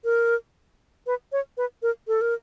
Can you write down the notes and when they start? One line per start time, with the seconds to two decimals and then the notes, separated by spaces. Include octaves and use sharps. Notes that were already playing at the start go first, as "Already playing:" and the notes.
0.04 A#4
1.07 B4
1.32 C#5
1.57 B4
1.82 A#4
2.08 A4
2.21 A#4